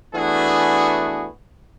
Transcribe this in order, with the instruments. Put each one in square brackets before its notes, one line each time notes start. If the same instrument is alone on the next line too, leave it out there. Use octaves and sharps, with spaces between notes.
[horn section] E3 A3 B3 D4 F#4 G#4